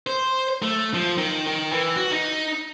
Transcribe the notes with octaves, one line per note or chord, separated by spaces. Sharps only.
C5
A3
F3
D#3
D#3
E3
F#4
D#4